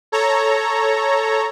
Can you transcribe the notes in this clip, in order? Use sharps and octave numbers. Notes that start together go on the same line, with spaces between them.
A4 C#5 A#5